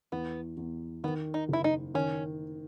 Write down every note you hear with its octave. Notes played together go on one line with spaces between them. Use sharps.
E2 B3
E2
D#3 B3
D#4
F#1 E4
D#4
D#3 C#4